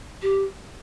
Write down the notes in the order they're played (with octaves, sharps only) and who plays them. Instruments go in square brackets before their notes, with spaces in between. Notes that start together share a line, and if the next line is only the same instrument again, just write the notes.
[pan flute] G4